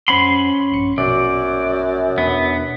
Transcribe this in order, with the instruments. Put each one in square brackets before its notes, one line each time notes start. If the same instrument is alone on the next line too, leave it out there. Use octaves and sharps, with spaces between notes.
[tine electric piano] F#2 C5 F#5 [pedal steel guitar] C#4 B5 C6
[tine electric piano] A#1 G2 C#7
[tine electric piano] A#1 B2 [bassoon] F#2 [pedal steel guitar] D5
[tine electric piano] E2 B2 D4 [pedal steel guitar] B3